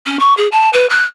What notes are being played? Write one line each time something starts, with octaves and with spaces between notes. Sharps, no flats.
C#4
C#6
G#4
A5
B4
F#6